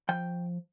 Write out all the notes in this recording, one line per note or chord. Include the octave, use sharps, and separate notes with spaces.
F3 G5